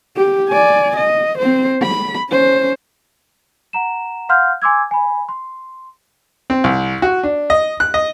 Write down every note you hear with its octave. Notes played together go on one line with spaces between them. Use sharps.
G4
D5 G#5
D#5
C4 C5
B5
C#4 C5
F#5 A#5 E7
F5 F#5 C6 F6 G6
G#5 C6 D6 E6 G#6
G#5 B5
C6
C4
C2
F#4
D4
D#5
F#6
D#5